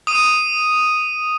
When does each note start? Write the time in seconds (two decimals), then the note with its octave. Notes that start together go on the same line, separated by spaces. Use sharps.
0.07 D#6 D#7